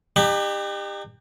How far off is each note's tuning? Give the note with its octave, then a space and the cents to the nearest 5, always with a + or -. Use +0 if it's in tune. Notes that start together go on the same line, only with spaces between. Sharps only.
D#4 -40 G4 +25 B5 +0